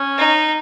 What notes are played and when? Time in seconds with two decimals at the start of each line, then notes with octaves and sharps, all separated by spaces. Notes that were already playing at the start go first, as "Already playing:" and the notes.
Already playing: C#4
0.18 D#4